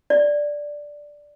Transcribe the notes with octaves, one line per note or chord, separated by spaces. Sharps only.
D5